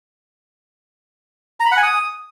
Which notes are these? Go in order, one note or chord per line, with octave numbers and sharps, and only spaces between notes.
A#5
B5
F#5
G#5
D#6